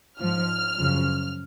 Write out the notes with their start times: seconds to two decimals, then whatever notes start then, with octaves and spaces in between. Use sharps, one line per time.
0.20 G#2 F3 F6
0.78 F#2 C#3 F3